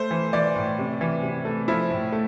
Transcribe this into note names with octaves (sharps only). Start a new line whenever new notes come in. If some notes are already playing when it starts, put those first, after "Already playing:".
Already playing: A3 C5
E3
E3 D5
A2
C3
E3
C3
A3
F3 E4
A2
A3